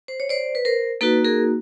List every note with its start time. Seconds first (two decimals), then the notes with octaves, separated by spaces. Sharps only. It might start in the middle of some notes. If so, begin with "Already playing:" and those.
0.08 C5
0.20 C#5
0.29 C5 D5
0.55 B4
0.65 A#4 C5
1.01 A#3 D#4 F#4 A4 B4
1.24 G#4 A#4